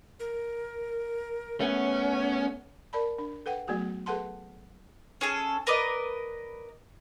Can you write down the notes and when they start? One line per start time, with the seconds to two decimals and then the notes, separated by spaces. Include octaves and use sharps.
0.20 A#4
1.61 A3 B3 C#4 F#5
2.93 A#4 D5 A5 B5
3.18 D4
3.46 A4 B4 F#5 G5
3.67 F#3 A3 B3 F#4 G#4
4.06 G#4 A4 B4 F#5 A5 C6
5.21 C#4 G#4 A4
5.67 A#4 B4 D5 D#5